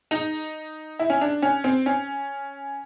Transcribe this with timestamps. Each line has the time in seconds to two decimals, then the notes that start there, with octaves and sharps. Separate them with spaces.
0.11 D#4
0.99 E4
1.10 C#4
1.21 D4
1.42 C#4
1.64 C4
1.86 C#4